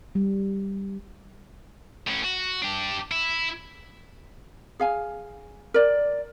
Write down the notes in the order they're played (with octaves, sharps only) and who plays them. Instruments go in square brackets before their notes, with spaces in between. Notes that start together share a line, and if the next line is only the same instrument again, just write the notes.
[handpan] G3
[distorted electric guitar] A2 C#4
F#4
D4 G4
E4
[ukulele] G#4 F5 G#5
A#4 D5